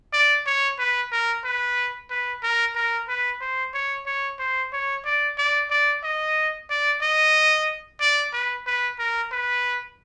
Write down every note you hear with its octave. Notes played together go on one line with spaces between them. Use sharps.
D5
C#5
B4
A#4
B4
B4
A#4
A#4
B4
C5
C#5
C#5
C5
C#5
D5
D5
D5
D#5
D5
D#5
D5
B4
B4
A#4
B4